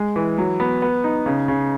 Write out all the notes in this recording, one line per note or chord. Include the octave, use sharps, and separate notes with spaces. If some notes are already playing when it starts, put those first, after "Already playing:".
Already playing: G#3
E3
F#3
B3
B3
D#4
C#3
C#3